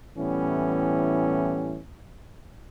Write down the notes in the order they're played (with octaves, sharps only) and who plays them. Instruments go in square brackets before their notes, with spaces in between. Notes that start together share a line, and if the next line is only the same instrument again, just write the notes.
[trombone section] A2 E3 G3 B3 C#4